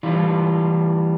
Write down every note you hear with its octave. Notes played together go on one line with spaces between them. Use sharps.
E3 G3 F4